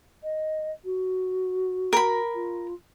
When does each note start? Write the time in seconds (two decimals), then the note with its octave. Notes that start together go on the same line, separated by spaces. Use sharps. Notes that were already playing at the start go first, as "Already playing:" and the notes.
0.23 D#5
0.84 F#4
1.93 A#4 B5
2.34 F4